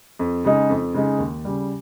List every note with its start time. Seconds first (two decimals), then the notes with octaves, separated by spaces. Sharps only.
0.19 F2
0.45 C#3 G#3 D#4
0.70 F2
0.94 C#3 G#3 D#4
1.19 D#2
1.45 C#3 G3